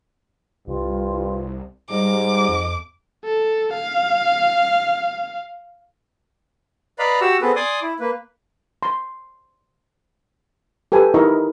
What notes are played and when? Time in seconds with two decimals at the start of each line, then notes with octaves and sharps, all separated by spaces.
0.67 C2 G2 F4
1.90 G#2 G3 D#5 D6
2.49 F2
3.25 A4
3.73 F5
6.99 B4 D5 D#5 F5 A#5 B5
7.21 F#4 G4 F#5 E6
7.41 B3 C4 G#4 A4 B4
7.56 D5 G#5 C6 D6 D#6
7.82 E4
8.00 A#3 B4
8.83 C6
10.92 G4 A4 B4 G#5
11.14 D#4 E4 A#4 D#5 C#6